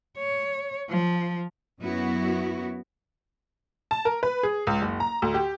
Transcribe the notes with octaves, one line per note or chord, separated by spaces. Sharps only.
C#5
F3
F#2 F#3 B3 E4 F#4
A5
A#4
B4
G#4
C#2
F#1
A#5
D2
G4